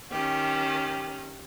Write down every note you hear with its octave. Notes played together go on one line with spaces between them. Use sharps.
D#3 C#4 G4